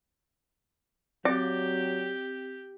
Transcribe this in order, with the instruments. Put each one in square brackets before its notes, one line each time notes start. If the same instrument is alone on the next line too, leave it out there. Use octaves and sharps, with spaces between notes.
[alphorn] F#3 [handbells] C4 A#6 [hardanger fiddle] G4 [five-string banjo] D5